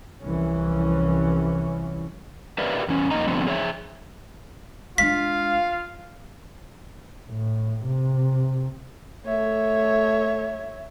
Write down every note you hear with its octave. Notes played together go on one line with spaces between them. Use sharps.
C2 E3 F3 C#4
G4 A#4 B4 D5 E5 F5
E2 C#4
F2 A#3 D#4 D#5 A#5
D3 F3 A3 B3 C4 D4
G#4 C#5 D5 E5
G#3 D4 F4 F5 B6
A2
C3
A3 C#5 E5